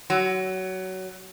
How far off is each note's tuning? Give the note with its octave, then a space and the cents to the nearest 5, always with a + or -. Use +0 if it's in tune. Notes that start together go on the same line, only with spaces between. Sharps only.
F#3 +20